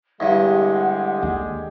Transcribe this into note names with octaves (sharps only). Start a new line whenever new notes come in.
E2 G2 D3 G#3 G4 F#5
D#2